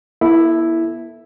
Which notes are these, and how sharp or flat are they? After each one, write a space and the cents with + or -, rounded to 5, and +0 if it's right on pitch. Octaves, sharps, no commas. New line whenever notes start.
B3 -45 E4 +0 A4 +0